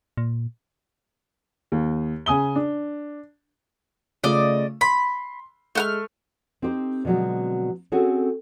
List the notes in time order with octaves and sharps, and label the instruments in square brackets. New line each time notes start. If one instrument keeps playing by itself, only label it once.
[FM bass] A#2
[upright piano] D#2
C#3 G#5 D#6 G7
D4
[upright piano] C#3 A3 F4 [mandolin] D5 D#5
[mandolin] B5 [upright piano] C6
[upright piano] G#3 [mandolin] A3 F#5 F6
[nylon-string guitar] C4 D#4 G4 C5
B2 D3 F3 F#3 G#3 C4
C4 C#4 F#4 G#4 A4 C#5